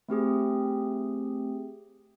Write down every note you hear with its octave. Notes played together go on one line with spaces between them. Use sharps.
A3 C4 G4 G#4